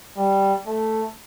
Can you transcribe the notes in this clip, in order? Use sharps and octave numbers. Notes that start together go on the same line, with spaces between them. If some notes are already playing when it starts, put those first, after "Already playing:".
G3
A3